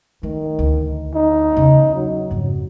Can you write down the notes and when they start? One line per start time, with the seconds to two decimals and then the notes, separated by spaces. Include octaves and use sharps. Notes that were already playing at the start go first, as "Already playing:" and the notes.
0.23 D#3 A3
0.59 D2
1.15 D#4
1.57 E2 C#3
1.95 F#3
2.31 F2 G#2